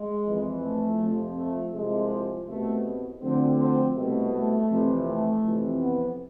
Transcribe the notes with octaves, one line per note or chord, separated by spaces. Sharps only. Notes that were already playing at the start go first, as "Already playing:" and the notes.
Already playing: G#3
F2 E3
A3
F2 C3 F3
A3
C2 C3 F3 G#3
C2 B2 A3
D2 D3 F3 C4
C4
C2 B2 A3
A3
F2 C3 E3
A3
F2 C3 E3
B3